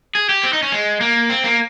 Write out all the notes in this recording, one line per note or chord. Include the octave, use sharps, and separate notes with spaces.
G#4
G4
C4
D#4
C#4
G#3
A#3
C4
A#3